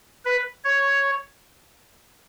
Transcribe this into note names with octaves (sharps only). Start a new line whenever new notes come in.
B4
C#5